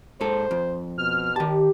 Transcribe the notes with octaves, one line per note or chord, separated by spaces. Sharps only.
G#2 A4 C5
F2
B2 F6
D#3 G4 A5